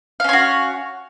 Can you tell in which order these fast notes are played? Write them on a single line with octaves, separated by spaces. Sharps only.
F5 C#4 C#5 F#4